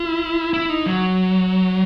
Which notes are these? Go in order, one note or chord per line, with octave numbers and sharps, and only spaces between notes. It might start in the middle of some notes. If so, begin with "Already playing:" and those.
Already playing: E4
E4
D#4
F#3